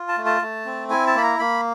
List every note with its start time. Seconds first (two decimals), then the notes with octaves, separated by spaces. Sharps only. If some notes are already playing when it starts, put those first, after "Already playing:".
Already playing: F4
0.08 A5
0.18 A3
0.26 A5
0.42 A3
0.65 C4
0.90 E4 G#5
1.07 A5
1.15 A#3 B5
1.23 A#5
1.39 A#3 B5